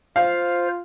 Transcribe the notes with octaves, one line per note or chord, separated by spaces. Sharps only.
F4 C5 F5